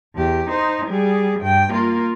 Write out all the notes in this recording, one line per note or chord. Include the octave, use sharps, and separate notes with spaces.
E2 G4
D#4 C5
G3 G#4
G2 G5
A#3 F4